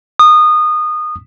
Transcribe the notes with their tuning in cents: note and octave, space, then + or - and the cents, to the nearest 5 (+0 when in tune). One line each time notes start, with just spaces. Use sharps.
D#6 -20